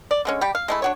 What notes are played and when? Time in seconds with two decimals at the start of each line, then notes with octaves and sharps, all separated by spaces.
0.11 D5
0.25 D3 G#3 C#4
0.41 G3 G4
0.55 F5
0.68 G#3 A3 E4
0.82 D4 F#4 C#5